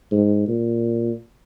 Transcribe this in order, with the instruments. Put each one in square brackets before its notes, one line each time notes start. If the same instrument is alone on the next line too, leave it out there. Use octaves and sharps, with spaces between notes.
[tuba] G#2
A#2